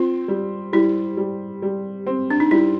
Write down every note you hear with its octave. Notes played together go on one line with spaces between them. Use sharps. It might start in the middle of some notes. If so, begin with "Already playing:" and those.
Already playing: C4 F4
G3
G3 E4
G3
G3
C4
D4
D#4
G3 E4